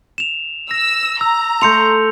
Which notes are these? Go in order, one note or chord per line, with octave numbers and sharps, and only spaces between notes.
E7 F7
E6 A#6
A#5 E6
A3 A5 C6 G6 C#7 F7